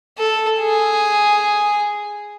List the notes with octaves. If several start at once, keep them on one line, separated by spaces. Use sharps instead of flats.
A4
G#4